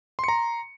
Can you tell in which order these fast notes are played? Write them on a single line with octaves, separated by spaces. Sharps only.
C6 C#7 A#5